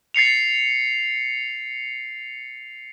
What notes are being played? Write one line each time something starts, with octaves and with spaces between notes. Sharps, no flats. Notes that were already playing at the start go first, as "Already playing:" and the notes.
A6 C7 C#7 F7